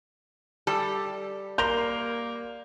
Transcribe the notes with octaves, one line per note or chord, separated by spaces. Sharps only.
G3 A4
A#3 A#4 C6 G6 F7